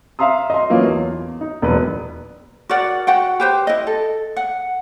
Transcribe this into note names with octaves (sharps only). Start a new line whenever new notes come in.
E5 F5 A#5 C6 D#6
D#5 C6
E3 F#3 A#3 C#4 F4
E2
D#4
E1 A#1 F#3 B4
F#4 A#4 D5 F#5
F#4 F#5 G5
G4 B4 C5
E4 D#5
A4
F#5